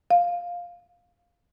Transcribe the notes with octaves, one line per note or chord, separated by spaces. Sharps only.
F5